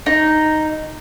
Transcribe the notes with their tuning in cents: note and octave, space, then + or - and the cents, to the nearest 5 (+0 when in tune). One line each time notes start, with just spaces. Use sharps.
D#4 -5